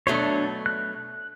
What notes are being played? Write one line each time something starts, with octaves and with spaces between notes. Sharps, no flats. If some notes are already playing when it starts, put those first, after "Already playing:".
B2 F#3 A3 D4 C#5
F#6